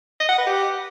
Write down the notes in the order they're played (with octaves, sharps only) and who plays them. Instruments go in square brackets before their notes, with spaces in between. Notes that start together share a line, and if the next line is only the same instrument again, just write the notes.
[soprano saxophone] D#5
F#5
B4
G4